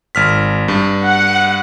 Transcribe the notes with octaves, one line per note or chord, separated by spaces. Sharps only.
G#1 F6 B6
G2
F#5